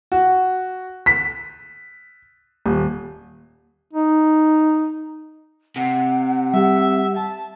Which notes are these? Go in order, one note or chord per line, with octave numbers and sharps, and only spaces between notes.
F#4
B6
D#1
D#4
C3 F#5
G3 G4 E5
A5